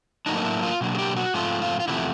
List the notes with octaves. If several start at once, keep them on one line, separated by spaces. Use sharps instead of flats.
A2 F#3 A#3 D4 D#4
D#4
E4
F4
B2 F#3 A#3 D4
G#4
G4
F#4
G#2 F3 A3 C4 F4
F4
F4
E2 C3 F3 A3 E4